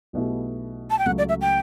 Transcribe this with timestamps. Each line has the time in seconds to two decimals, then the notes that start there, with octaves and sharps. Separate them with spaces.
0.13 B1 B2 A3 E4 G4
0.91 A5
0.99 G5
1.06 C#2 C#3 F#3 A3 F#5
1.18 D5
1.29 E5
1.41 G5